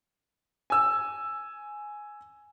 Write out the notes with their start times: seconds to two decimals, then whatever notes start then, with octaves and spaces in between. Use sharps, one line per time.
0.70 G#5 E6